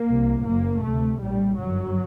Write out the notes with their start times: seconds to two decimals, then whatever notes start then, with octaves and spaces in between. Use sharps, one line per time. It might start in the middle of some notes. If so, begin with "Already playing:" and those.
Already playing: A#3
0.10 C2 C3
0.46 F#1 F#2 A#3
0.83 D2 C3 A3
1.20 A#1 A2 G3
1.58 G1 F#2 F#3